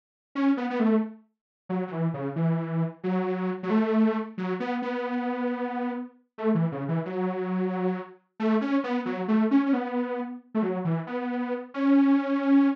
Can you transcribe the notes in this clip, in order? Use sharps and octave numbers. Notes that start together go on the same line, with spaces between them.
C#4
B3
B3
A3
F#3
F#3
E3
C#3
E3
F#3
F#3
A3
F#3
B3
B3
A3
E3
C#3
E3
F#3
A3
C#4
B3
F#3
A3
C#4
C#4
B3
A3
F#3
E3
B3
C#4